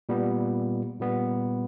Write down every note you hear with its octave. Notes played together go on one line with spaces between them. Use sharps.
A#2 G3 B3
A#2 G3 B3